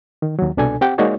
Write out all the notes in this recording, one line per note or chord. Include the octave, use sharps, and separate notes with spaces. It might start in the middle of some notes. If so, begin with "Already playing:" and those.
D#3
D#2 F#3
C2 B2 D4 A4 G#5
C4 G4 F#5 G5
G#3 A#3 D#4 F#4 C#5 D5